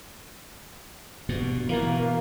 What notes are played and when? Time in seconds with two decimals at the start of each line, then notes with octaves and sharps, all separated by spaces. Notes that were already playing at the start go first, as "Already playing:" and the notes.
1.29 G2 B2
1.69 B2 E3 A#3